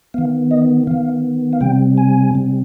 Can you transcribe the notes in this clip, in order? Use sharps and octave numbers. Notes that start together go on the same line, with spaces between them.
D#3 B3 F5
D#5
D#3 B3 F5
F5
C3 G3 C4 G5
G#5
C3 G3 C4